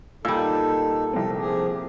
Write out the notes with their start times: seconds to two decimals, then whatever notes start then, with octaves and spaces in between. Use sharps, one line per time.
0.25 A#2 G3 D#4 A4 E6
1.13 C2 C4 A4
1.37 F3 G4 G#4